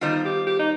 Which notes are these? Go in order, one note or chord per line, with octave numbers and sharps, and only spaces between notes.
D#3 G3 B3 D#4 F4 C5
G4
G4
D#4